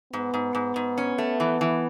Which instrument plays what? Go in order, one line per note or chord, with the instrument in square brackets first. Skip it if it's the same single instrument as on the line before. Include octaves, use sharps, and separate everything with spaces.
[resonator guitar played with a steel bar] G#2 [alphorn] B3
[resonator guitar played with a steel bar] G#2
G#2
G#2
C#4
A3
E3
E3